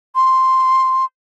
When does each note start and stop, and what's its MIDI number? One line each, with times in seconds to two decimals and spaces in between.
0.15 1.05 84